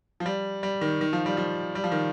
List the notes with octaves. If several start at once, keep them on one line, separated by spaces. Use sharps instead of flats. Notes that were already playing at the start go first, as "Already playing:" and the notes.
F3
G3
G3
D#3
D#3
F3
G3
F3
G3
F3
D#3